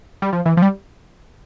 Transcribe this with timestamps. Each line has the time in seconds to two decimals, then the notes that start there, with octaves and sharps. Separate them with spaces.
0.22 G3
0.33 F3
0.46 E3
0.57 F3
0.62 G3